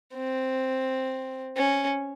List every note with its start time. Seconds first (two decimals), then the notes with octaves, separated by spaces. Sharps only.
0.15 C4
1.56 C#4